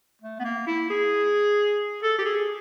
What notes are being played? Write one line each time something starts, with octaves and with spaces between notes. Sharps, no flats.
A3
B3
A#3
E4
G#4
A4
G4
G#4